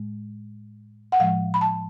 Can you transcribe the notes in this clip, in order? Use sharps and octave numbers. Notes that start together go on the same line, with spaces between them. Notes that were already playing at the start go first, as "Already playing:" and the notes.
Already playing: A2 G#3
F#5
A2 F3 G#3 F5
B5
A5